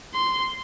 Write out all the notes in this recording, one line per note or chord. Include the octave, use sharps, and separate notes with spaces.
C6